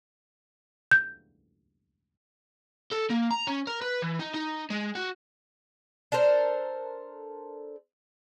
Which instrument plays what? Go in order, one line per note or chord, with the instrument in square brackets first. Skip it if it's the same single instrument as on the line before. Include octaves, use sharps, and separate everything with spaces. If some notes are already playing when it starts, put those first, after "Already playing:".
[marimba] G6
[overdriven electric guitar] A4
A#3
A#5
C#4
A#4
B4
E3
D#4
D#4
G#3
F#4
[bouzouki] D4 A4 A#4 C5